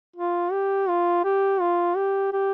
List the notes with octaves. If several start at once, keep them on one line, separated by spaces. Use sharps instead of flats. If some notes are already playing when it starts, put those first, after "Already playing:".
F4
G4
F4
G4
F4
G4
G4